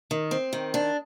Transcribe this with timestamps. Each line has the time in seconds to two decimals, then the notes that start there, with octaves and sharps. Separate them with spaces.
0.11 D#3
0.31 C4
0.53 D#3
0.74 D4